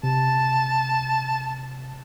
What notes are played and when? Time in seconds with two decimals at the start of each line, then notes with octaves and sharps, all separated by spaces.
0.03 C3 A5